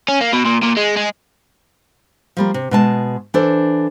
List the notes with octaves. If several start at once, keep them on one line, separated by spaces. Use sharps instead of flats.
C#4
A#3
B2
A#2
A#2
G#3
G#3
F3 G3 A#3
C3
B2 G#3 A5
E3 D4 A4 C5